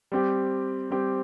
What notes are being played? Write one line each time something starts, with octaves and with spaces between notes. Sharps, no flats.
G3 C4 G4
G3 C4 G4